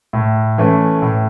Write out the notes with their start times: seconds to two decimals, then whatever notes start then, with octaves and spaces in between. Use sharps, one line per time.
0.13 A2
0.58 E3 A3 C#4
1.02 A2